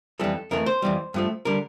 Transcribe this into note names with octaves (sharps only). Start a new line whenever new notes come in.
F2 E3 G3 A4
F2 E3 A3 A#4
C5
F2 E3 G3
G2 F3 A3
D3 G3 A#4